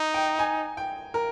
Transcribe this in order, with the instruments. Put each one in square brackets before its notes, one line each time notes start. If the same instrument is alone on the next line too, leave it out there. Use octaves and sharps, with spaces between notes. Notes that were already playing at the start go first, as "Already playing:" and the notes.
Already playing: [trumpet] D#4
[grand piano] G5
G#5
G5
A#4